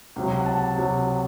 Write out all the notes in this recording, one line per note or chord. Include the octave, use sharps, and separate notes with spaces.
C#2 C3 F#3
F#5
A5
C3 F#3 F#5